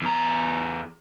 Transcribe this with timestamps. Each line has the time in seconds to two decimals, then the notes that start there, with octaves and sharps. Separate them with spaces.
0.02 E2 A#5